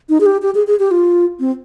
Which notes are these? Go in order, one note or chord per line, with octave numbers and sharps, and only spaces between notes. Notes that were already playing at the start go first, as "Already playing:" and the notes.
D#4
G#4
G4
G4
G#4
G#4
G4
F4
C4